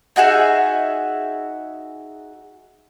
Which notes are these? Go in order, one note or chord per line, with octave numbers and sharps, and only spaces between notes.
D#4 F#4 G#4 E5